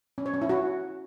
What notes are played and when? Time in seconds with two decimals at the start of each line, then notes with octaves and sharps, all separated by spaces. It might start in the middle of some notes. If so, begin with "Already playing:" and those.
0.18 C#4
0.26 C#5
0.34 C#4
0.42 E4
0.49 F#4